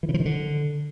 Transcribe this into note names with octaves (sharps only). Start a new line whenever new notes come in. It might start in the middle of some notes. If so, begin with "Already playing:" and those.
E3
C#3
F3
D#3
D3